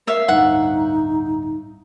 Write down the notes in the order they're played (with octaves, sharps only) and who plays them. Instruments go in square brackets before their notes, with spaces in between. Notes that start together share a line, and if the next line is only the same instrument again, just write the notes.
[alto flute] A#4 [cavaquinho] C#5 E5 F5
[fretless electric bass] D1 G2 [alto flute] D#4 [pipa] F#5